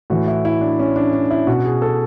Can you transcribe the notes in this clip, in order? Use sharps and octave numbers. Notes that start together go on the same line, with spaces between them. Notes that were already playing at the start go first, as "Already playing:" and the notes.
A2 E3 F#4
E4
E4
D4
C#4
D4
D4
E4
B2 F#4
G#4
A4